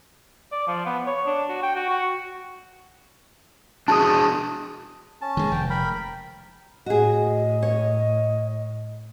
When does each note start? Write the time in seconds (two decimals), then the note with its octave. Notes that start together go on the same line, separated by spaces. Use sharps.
0.52 D5
0.67 F3
0.86 B3
1.07 C#5
1.26 D4
1.49 F#4
1.63 G5
1.76 F#4
1.90 F#4
3.88 D4 F#4 G#4 A5 D#6
5.21 C#4 A5
5.37 D#3 G#3
5.52 F1 G5
5.70 A#4 G5 B5
6.86 A2 F#4 G#4 D#5
7.63 C#5